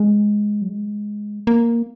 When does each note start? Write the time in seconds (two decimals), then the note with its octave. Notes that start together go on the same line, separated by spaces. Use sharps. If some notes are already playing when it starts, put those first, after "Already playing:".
Already playing: G#3
0.62 F#3
0.69 G#3
1.47 A#3